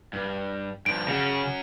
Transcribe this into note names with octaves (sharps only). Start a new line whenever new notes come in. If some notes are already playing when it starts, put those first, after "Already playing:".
G2
G2 F3 D7
C#3 C#4 F#4